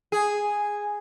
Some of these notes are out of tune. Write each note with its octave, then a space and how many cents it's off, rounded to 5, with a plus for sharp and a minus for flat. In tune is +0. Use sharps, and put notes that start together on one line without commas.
G#4 -5